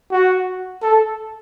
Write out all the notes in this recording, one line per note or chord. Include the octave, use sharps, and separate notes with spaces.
F#4
A4